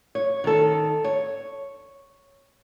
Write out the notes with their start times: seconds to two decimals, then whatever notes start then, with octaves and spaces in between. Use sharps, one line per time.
0.15 C#5
0.44 D#3 A4
1.04 C#5